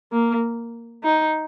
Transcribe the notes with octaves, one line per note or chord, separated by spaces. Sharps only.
A#3
D#4